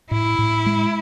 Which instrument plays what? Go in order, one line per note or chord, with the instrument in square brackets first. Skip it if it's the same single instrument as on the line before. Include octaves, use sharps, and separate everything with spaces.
[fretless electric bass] A2 [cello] E4
[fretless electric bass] A2
G#3